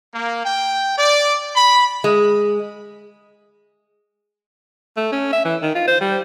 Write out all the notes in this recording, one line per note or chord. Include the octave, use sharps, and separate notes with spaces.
A#3
G5
D5
B5
G#3
A3
C#4
E5
E3
D#3
F4
C5
G3